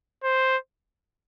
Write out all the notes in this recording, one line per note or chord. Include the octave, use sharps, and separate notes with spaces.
C5